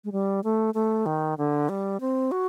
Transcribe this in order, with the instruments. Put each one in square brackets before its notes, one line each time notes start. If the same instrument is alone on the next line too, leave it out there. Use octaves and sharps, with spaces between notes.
[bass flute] G#3
G3
A3
A3
D#3
D3
G3
C4
F#4